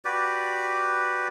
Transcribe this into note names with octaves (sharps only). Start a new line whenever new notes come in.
F#4 G4 B4 D5